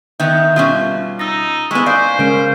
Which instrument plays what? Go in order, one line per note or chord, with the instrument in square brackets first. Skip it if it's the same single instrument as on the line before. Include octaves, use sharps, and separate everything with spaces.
[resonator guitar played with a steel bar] D#3 B3 [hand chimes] E5 G6
[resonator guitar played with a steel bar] B2 G3 C#4 [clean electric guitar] F4
[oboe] D#4 [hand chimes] E6 A6 A#6
[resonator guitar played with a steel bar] G#3 B3 [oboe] E4 [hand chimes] G#5 C#6
[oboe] C5 [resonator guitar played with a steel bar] D5 [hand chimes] F5
[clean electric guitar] C#3 G#3 C#4 [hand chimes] A#4 F5 D7